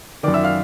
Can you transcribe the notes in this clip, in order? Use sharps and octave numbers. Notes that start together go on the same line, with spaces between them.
F#2 D#3 D5 D6
E5 E6
F5 F6